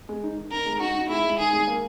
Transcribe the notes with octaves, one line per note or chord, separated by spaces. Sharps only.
G#3
D#4
D#3
D#4 A#4
G#3
D#4 F#4
D#4
G#3 E4
G#3
D#3 G#4
G#3
A#3